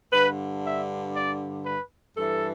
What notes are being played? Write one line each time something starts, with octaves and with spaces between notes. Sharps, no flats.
G2 D3 B4
E5
D5
B4
G2 E3 A4